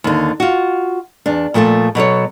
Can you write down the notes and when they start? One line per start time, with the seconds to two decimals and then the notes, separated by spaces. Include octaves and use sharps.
0.04 D#2 D3
0.40 F4 F#4
1.26 E2 D4
1.54 A#2 F3 A3 A4 A5
1.95 B2 F#3 A4 C#5